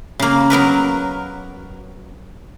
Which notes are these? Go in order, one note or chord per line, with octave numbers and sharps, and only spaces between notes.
C#3 A#3
F#3 B3 A#4 B4